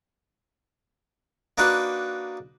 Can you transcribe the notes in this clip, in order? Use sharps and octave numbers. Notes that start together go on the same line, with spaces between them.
A#3 D4 D#4 F#4 B4